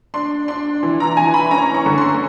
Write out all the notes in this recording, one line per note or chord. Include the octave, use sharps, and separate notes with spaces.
D4 C6
D4 C6
E3
A#5
E3 G#5
B5
C#4 A#5
C#6
D3
C6